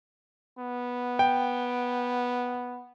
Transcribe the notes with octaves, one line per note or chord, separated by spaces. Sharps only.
B3
G5